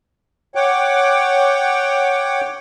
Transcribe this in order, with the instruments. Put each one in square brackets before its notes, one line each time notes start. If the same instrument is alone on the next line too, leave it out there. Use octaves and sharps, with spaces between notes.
[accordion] C#5 F#5 G5 D6